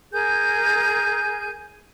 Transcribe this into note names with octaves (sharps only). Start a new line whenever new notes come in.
G#4 A#4 G#5 G6